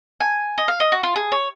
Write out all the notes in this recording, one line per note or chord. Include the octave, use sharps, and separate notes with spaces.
G#5
D#5
F5
D#5
F#4
F4
G#4
C#5